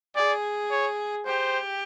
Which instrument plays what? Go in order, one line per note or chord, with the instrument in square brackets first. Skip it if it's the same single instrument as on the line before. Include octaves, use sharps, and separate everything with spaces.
[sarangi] G#4 [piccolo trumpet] D5
[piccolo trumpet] C#5
[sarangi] G4 [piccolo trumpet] C5